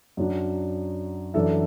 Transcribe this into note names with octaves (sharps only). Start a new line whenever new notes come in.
F#2 F#3 D4
F#2 E3 D4 A4 E5